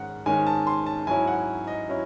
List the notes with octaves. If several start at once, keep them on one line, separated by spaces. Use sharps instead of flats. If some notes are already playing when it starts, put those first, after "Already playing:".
Already playing: G#2 D#3 G#3 C#4 F#5
G#2 D#3 G#3 C#4 G#5
A5
C6
A5
G#2 F#3 C#4 E4 G#5
F#5
D#5
F#3 C#4 E4